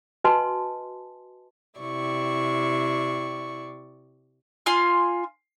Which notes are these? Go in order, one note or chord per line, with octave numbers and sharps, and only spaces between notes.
F#4 B4 D#5 G#5 A5 C6
C3 E4 D5 C#6
F4 G#5 C6 F6